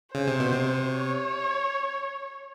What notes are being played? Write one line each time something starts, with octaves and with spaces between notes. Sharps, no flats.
C#3 C5
C3
B2
C3
C#5